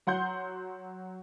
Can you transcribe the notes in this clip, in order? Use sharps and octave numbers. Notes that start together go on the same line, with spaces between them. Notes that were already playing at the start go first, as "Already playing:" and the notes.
F#3 F#5 C6 G6